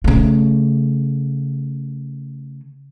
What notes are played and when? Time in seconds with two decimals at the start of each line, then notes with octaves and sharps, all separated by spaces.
0.04 C#3 A3